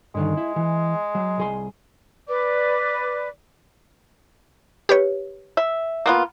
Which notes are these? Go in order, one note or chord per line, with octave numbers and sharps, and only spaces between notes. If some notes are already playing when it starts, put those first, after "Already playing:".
G2 D3 D#3 G#3
E4
E3
F#3
C2 G#4 C6
B4 D5 D6
G4 B4 C#5
E5
A#3 B3 F4